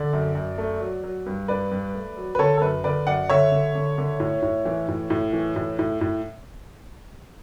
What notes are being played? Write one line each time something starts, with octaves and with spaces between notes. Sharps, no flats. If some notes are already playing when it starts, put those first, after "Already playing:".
Already playing: D3 D5
F#2
F#2
A3
F#3
F#3
G2
G2 B4 D5
G2
A3
F#3
B4
D3 A4 C#5
A4
F#2 B4
D3 B4 D5
F#2 D5 F#5
D3 C#5 E5
D3
D3
D3
A2
A2
E3
A2
A2
E3
A2
A2
A2